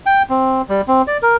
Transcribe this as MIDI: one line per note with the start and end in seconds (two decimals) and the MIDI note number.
0.06 0.22 79
0.29 0.62 60
0.69 0.81 55
0.88 1.02 60
1.07 1.18 74
1.22 1.37 70